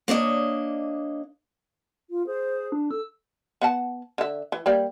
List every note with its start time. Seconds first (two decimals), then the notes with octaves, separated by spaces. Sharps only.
0.08 A#3 D4 C#5 D#5
2.10 F4
2.27 G#4 C5
2.72 D4
2.91 A4 E6
3.61 B3 F#5 A5
4.18 D3 E5
4.52 E3
4.66 G3 A#3 D5